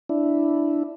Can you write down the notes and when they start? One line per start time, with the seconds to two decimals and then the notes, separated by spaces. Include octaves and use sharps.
0.09 D4 E4